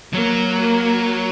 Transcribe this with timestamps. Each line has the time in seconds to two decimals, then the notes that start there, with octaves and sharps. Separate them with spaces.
0.14 F#3 A#3
0.62 A#3